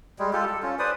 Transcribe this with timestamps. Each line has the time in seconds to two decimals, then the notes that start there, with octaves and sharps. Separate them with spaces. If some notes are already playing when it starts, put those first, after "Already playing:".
0.19 G3 G#3
0.33 F4 G4 A4
0.47 A4
0.63 C#4 F4
0.79 B4 C5 D5 D#6